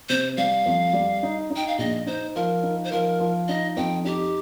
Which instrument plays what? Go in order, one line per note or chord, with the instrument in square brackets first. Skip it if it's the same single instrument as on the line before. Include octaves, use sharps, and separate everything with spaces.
[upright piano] C3 [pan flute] C5
[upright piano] G3 [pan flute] F5
[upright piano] F2
G3
D#4
D#4
[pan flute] G5
F5
[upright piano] A#1 [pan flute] D#5
[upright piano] D#4 [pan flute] C5
[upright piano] F3 [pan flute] A#4
[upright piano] D#4
[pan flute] C5
[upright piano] F3 [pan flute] A#4
[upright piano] F3
[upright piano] D#4 [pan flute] D#5
[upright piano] F2 [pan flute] G5
[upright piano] D#4 [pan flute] G4